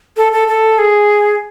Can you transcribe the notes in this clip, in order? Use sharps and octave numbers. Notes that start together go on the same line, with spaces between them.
A4
A4
A4
G#4